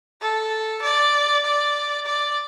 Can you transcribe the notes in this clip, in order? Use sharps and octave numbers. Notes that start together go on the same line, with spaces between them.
A4
D5
D5
D5